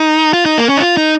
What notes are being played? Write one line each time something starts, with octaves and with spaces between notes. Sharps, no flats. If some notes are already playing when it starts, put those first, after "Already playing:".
Already playing: D#4
F4
D#4
A#3
C#4
D#4
F4
D#4